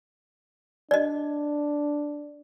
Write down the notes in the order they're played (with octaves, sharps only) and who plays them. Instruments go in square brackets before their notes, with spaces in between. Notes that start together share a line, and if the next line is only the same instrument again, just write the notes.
[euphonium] D4 [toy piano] D5 D#5